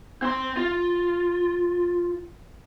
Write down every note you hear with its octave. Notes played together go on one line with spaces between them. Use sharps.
C4 C6
F4